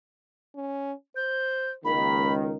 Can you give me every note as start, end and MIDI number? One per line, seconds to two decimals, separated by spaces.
0.55 0.93 61
1.16 1.75 72
1.16 1.71 91
1.85 2.56 37
1.85 2.56 51
1.85 2.29 58
1.85 2.34 83